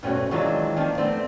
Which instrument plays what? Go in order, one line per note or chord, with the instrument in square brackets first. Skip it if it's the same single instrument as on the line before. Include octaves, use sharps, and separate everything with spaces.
[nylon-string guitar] E2 G2 B2 A3 C4 C#4
D#3 E3 F#3 G#3 D4 F4
D#3 F3 C4 D4 D#4
A3 B3 C4 D4